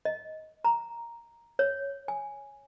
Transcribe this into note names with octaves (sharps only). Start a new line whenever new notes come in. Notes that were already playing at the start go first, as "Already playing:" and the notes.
D#5
A#5
C#5
G#5